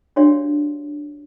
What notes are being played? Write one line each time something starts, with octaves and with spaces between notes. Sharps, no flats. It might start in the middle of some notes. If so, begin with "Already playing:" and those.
D4 F#4 G4 C#5 D5 F5